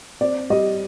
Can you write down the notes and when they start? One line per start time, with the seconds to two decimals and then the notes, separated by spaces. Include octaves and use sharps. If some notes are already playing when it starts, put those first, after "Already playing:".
0.21 C4 D5
0.50 G3 D#5